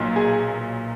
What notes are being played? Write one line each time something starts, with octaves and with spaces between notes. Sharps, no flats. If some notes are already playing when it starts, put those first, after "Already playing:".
Already playing: B1 A#2 F#3
G#4